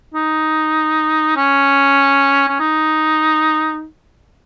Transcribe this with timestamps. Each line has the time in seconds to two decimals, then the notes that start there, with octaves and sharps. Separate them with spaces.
0.14 D#4
1.37 C#4
2.48 C#4
2.60 D#4